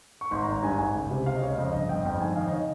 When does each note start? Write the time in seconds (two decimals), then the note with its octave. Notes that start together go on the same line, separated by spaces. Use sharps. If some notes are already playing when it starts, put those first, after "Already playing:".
0.21 C#6
0.31 G#1 C6
0.43 A#5
0.47 G#1
0.53 A#5
0.63 G2 G#5
0.78 G#1 G#5
0.95 C#2
1.11 C3
1.26 C3 F5
1.35 D#5
1.41 C#2 C#5
1.53 F5
1.58 F2 D#5
1.74 G1 D#5
1.89 G1 G5
2.05 F2 G5
2.21 G#2 G#5
2.36 D#3 F5
2.47 D#5
2.52 D#3 C#5